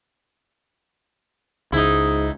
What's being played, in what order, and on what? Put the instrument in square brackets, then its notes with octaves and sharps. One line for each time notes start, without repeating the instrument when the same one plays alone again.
[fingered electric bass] C#2 [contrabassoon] G#2 [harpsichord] D#4 E4